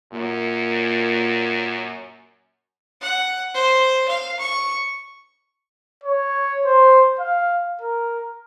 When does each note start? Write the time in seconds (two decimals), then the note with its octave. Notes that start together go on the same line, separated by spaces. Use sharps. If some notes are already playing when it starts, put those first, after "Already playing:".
0.13 F#2 A#2
3.02 F#5
3.55 C5
4.08 F5
4.40 C#6
6.04 C#5
6.65 C5
7.19 F5
7.81 A#4